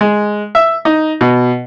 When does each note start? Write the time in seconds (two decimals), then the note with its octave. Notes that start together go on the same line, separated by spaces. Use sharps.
0.01 G#3
0.55 E5
0.85 D#4
1.21 B2